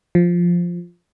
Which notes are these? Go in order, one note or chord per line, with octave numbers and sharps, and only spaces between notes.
F3